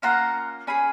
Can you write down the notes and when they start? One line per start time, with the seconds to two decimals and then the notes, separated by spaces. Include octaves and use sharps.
0.02 A#3 C#4 F4 F#5 A#5
0.67 C#4 G#4 G#5 B5